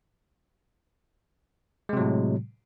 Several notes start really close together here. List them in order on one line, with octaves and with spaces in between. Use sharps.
G#3 C3 F#3 A2